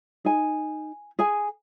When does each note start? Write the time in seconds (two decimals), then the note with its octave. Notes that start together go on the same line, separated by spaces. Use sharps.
0.25 D#4 G#4 G#5
1.19 G#4 G#5